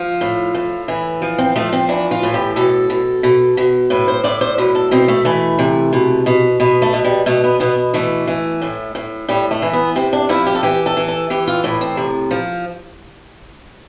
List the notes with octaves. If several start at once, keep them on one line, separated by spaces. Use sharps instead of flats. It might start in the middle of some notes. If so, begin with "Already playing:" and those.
Already playing: F3 F4
A2
A2
E3
F3
C4
F3 A3
C4
E3 D4
F4
A2
G4
B2 A4
B2
B2
B2
A2 B4
C5
A2 D5
C5
B2 B4
A4
B2 C4
A3
E3 A3
C3
B2
B2
B2 B3
A3
B2
G3
B2 A3
B3
B2 B3
E3 A3
E3
A2
A2
A2 G3
A3
E3
B3
C3 C4
D4
F3 E4
G4
A4
E3 G4
A4
E3
A4
E3 G4
F4
A2 E4
C4
C3
F3